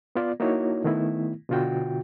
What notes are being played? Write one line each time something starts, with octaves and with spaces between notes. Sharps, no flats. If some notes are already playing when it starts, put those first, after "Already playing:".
B3 F4 D5
A#3 D#4 E4 F#4 C#5
D#3 A3 B3 E4
B2 D3 F4 F#4 G5